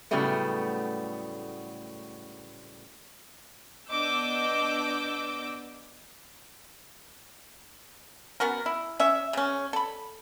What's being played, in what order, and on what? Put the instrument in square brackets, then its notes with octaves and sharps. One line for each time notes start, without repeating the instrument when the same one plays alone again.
[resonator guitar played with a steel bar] A2 C#3 F#3 G3 A3 B3
[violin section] B3 D4 D#5 D6 E6 G6
[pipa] B3 C#4 F#4 A#4
E4
C#4 E5
C#3 C#4
A4 B5